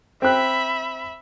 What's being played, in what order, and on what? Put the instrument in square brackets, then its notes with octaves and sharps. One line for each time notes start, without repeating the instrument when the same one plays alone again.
[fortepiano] C4 F#6 [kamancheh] E5 B5